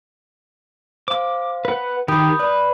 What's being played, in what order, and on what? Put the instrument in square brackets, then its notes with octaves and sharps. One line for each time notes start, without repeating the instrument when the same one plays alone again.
[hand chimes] C5 F5 [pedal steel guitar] D6
[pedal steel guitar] B4 F#5
[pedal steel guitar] D#3 G4 [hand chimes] B5 D#6 G6
[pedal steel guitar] B4 [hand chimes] D5 B5